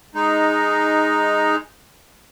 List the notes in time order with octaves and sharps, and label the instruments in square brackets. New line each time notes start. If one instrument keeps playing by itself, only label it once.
[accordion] G#3 D#4